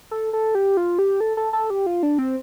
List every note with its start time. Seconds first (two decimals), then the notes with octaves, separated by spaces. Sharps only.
0.11 A4
0.33 A4
0.55 G4
0.77 F4
0.99 G4
1.20 A4
1.37 A4
1.53 A4
1.70 G4
1.86 F4
2.03 D4
2.18 C4